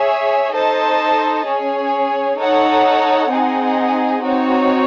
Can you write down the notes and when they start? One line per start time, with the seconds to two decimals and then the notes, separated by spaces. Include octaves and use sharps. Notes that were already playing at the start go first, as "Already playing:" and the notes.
Already playing: G#4 C#5 E5
0.54 D#4 A4 C5 D#5 A5
1.46 C#4 G#4 C#5
2.38 D#4 A4 C#5 F#5
3.30 C4 D#4 G#4 D#5 F#5
4.22 C4 D#4 F#4 C#5